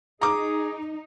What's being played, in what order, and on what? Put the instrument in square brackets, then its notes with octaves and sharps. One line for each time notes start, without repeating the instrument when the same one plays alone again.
[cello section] D#4 [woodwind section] G#4 [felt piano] A#5 D6